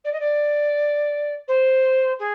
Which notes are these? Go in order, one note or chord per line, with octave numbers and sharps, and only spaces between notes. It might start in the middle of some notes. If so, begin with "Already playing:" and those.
D5
D#5
D5
C5
G#4